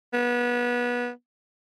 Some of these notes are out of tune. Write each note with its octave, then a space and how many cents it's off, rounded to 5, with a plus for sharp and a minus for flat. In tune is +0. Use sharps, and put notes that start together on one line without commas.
B3 -25